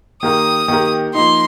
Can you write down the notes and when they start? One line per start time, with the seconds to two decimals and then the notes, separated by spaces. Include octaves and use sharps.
0.22 D#3 A#3 G4 A#4 D#6
0.68 D#3 A#3 G4 A#4
1.14 F3 A#3 D#4 C6